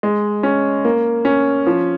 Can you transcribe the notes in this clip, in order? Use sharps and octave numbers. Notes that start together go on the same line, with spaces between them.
G#3
C#4
A#3
C#4
F3